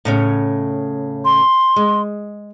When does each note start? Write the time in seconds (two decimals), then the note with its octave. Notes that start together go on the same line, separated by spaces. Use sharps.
0.05 A2 C#3 C#4
1.25 C6
1.76 G#3